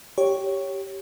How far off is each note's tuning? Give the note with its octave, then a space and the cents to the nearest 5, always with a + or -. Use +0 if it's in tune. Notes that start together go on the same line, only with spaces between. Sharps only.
G4 -5 C#5 +0